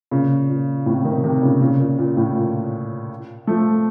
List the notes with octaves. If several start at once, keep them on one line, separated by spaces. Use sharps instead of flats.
A#2 C#3
A#2
A2 C3
C3 D#3
C3 D#3
A#2 C#3
A#2 C#3
A#2
A#2
A2
A#2
F3 A3